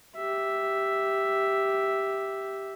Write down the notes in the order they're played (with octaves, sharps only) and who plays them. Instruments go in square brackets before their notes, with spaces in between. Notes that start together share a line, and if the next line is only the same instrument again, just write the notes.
[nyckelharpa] G4 E5